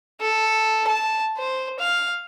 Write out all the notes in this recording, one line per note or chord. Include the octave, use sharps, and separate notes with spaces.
A4
A5
C5
F5